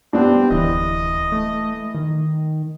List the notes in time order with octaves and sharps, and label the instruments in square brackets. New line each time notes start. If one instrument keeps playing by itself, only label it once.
[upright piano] G3 B3 D4 [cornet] C4
[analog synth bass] D1 [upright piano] E3 [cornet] D#5
[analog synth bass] A3
D#3